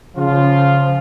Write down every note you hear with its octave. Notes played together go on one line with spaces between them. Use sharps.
C#3 F3 F4